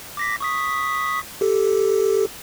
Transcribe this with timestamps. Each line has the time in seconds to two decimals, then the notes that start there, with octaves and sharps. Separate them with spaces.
0.17 D6 A#6 B6
0.41 C#6 D#6 B6
1.41 G4 A4